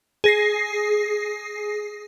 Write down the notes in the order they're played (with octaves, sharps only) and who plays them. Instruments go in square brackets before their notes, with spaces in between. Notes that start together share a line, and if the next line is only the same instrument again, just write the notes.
[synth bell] G#4 A#6 C7